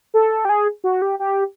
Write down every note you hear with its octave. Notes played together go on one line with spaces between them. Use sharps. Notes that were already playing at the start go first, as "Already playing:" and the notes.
A4
G4
G#4
F#4
G4
G4